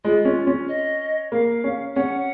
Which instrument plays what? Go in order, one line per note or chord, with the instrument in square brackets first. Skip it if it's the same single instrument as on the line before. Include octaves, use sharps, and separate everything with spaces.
[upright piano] G#3 [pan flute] F4
[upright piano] C#4
C#4
[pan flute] D#5
[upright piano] A#3 [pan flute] F5
[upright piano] C#4
[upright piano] C#4 [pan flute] F#5